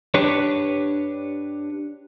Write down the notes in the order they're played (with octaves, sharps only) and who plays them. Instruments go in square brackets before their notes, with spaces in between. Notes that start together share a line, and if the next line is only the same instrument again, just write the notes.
[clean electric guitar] D4 G4 B4 C#5